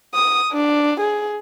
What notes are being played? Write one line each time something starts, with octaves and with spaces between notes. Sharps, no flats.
D#6
D4
G#4